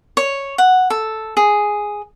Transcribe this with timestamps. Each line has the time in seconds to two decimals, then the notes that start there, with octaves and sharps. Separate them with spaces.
0.17 C#5
0.58 F#5
0.90 A4
1.37 G#4